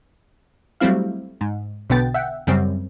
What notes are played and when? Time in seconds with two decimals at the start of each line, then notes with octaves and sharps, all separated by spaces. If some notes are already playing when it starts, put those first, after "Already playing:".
0.80 F#3 G3 A3 C4 E4 F5
1.41 G#2
1.90 B1 B2 D3 B3 G5 A6
2.14 E5 F#5 G5
2.47 F#2 C#3 G3 C4